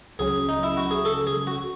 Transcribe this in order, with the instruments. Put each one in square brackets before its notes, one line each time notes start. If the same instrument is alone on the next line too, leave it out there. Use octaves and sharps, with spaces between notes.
[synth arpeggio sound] C#2 C#3 F#3 C#4 [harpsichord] G#4
[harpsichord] D#4
E4
F#4
G#4
A4
G#4
F#4